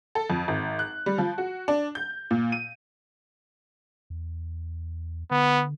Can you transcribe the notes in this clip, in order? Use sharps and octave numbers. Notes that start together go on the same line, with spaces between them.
A4
F2
G#1
F#6
G3
F3
F#4
D4
G6
A#2
D#7
E2
D3 B3